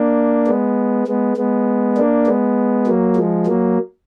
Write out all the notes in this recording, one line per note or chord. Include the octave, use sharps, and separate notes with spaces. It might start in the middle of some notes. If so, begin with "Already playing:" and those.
Already playing: A#3 D4
G#3 B3
G#3 B3
G#3 B3
A#3 D4
G#3 B3
F#3 A#3
F3 G#3
F#3 A#3